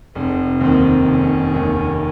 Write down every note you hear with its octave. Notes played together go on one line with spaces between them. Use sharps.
F1 C4
D#2 D#3 C4
F1 C#4
D#2 D#3